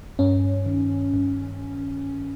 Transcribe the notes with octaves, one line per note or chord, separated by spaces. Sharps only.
G2 C#4
D#3
G2